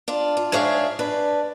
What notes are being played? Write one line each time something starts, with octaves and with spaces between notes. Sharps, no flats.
D4 F4
F4
G#2 D4 G#4 C#5 E5 F5
D4 B4